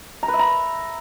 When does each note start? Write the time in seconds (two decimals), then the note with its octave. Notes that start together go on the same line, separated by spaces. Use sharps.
0.23 A#5
0.28 B4
0.34 E5
0.39 A#5